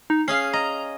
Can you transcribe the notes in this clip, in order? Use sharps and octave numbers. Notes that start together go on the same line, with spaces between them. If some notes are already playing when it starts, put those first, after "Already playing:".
D#4
C#4 G#4 F5 C7
D#5 A#5